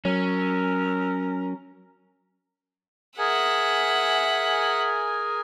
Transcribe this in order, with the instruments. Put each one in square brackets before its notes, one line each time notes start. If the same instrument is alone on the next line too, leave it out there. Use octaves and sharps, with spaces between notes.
[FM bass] F#3 [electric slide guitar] C#4 [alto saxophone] A#4
[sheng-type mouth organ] G#4 A#4 G#5 [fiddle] E5 F#5